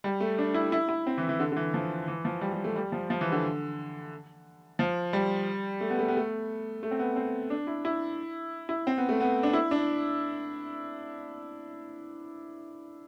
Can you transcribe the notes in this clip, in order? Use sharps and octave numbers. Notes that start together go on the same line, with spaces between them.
G3
A3
D4
E4
E4
E4
C4
E3
E3
D3
D3
E3
F3
E3
F3
G3
G3
A3
G3
F3
F3
E3
D3
F3
G3
A3
B3
A3
B3
A3
A3
C4
B3
C4
D4
E4
E4
E4
C4
B3
A3
B3
D4
E4
D4